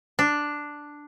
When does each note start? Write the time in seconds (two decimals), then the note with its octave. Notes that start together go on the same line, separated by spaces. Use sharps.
0.19 D4